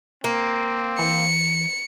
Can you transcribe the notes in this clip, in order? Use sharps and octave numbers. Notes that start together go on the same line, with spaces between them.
A#3 C4
E3 C#7